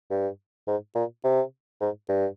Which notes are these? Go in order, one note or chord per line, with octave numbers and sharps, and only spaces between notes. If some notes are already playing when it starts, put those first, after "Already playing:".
G2
G#2
A#2
C3
G#2
G2